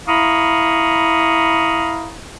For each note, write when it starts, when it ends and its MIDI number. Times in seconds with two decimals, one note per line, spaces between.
0.07 2.13 64
0.07 2.13 77
0.07 2.13 82
0.07 2.13 83
0.07 2.13 85
0.07 2.13 87